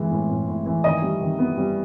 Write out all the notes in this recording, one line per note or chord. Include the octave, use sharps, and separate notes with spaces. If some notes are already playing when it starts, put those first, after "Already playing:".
Already playing: E3 G#3
A2
A2
A2
E3
D#3 D#5
G3
D#3
B3
G3